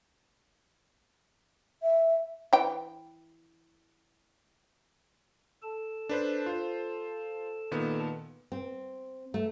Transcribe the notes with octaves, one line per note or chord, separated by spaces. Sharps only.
E5
E3 G5
A4 A5
D4 B4 C5
F4 C5
A#2 D#3 B3
C4
A3